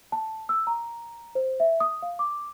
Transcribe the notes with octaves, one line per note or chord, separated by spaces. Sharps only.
A5
E6
A#5
C5
E5
D#6
F5
D6